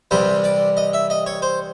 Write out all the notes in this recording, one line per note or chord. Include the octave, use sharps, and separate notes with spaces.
C2 C3 E3 G3 C5
D5
D#5
E5
D#5
C#5
C5